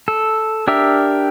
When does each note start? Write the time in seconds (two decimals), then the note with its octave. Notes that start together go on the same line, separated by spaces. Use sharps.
0.08 A4
0.68 D4 G4 A#4 E5